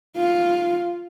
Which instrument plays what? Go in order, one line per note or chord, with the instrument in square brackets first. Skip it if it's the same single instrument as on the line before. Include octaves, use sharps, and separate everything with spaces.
[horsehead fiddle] F4